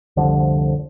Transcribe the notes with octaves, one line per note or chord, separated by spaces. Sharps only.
F1 C2 D3 F3